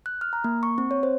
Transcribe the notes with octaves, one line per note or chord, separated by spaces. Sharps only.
F#6
F6
A#5
A#3
C#6
C4
C#5
C5